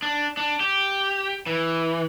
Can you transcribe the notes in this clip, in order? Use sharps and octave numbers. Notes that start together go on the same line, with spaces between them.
D4
D4
G4
E3